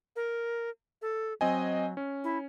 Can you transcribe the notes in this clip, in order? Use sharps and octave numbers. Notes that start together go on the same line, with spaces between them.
A#4
A4
F#3 C4 D#5 G#5
C#4
E4